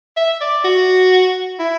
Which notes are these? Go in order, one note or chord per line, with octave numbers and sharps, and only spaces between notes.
E5
D5
F#4
E4